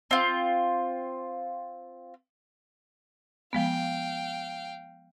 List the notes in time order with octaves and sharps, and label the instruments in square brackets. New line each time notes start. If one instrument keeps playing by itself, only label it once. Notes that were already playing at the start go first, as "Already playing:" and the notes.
[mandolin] C4 F4
[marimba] F3 G#3 B3 [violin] F5 G5